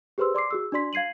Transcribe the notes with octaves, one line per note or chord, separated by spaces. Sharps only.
G4 G#4 B4 C5 C6 E6
D5 C6 D6 C7
F#4 G#4 E6
D4 F#4 D5 C6 B6
F5 G#6 C7 D#7 F#7